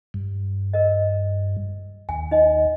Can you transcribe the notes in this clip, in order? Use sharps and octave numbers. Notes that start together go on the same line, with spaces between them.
G2
A#4 D#5
D#2 G#5
D#4 D#5